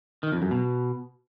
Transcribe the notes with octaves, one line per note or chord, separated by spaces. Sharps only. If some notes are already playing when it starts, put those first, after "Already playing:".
D#3
F2
F#2
B2